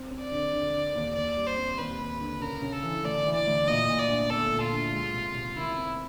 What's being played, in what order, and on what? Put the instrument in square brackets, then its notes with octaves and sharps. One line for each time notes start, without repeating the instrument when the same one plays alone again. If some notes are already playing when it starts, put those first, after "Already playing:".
Already playing: [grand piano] C4
C4
[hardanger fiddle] D5
[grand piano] D3
D3
D3
D#2
[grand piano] D#2 [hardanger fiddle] D5
[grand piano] G3
[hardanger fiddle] C5
[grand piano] C4
[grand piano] D#2 [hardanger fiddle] B4
[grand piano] D#2
D3
[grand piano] C#3 [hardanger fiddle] A#4
[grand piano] C#3
[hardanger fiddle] A4
[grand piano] E3
[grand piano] D2 [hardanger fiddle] D5
[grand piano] E3
[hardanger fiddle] D5
[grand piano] D2
[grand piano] A#2 [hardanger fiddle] D#5
[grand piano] A#2
[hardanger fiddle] D5
[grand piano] D4
[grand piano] B3 [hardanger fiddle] A4
[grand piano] A#2
[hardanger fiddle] F4
[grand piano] D4
G#3
C3
C3
[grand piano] D#3 [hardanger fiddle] E4
[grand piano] C4